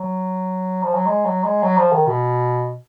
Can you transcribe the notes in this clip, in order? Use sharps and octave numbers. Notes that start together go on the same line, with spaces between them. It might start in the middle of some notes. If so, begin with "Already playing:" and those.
Already playing: F#3
F3
F#3
G#3
F#3
G#3
F#3
F3
D#3
B2